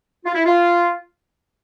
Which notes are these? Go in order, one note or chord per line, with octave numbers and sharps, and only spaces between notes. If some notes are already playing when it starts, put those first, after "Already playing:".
F4
E4
F4